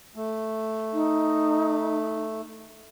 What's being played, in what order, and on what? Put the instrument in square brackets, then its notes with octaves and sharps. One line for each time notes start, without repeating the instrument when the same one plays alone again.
[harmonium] A3
[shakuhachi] D#4